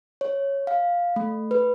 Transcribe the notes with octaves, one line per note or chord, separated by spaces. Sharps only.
C#5
F5
A3
B4